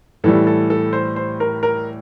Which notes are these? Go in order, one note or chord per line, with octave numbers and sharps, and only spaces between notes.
A2 E3 G3 A4
A4
A4
C5
C5
A#4
A#4